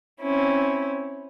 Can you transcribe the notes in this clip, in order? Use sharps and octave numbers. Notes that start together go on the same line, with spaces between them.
C4 C#4 E4